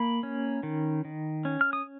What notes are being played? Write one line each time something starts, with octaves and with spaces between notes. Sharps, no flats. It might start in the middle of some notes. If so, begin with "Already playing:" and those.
Already playing: A#3 B5
C#4
D#3
D#3
C#4
F6
D#6